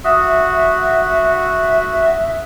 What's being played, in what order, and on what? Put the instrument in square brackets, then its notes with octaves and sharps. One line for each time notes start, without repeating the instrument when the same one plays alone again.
[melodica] F#4 [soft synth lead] E5 [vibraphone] D#6